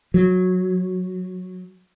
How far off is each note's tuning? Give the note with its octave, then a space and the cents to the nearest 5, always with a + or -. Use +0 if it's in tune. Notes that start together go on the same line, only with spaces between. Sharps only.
F#3 -10